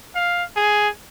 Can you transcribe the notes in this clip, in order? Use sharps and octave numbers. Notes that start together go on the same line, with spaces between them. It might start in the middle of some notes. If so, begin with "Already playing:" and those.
F5
G#4